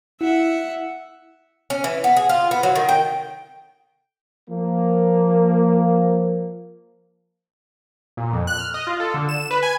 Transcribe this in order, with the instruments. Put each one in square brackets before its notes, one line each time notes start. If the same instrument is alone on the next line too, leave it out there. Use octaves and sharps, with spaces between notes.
[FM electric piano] E4 [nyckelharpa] E5 F#5
[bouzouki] C#4
E3
B3
G#4
F4
B3
F#3
D#3
G5
[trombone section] F3 A#3
[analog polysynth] A#2
F2
F#6
F6
D#5
F4
A4
D3
E7
B4
G#5